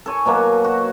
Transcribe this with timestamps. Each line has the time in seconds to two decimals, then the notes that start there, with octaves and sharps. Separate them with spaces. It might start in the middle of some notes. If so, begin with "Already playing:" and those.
0.06 A4 C#5 G#5
0.26 B2 F#3 A#3 F#4
0.64 F#4